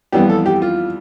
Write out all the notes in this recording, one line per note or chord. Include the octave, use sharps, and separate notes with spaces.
F2 E3 G3 B3 G4
A4
G4
F4